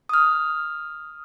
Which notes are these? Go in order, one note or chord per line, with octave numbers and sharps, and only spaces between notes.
D#6 F6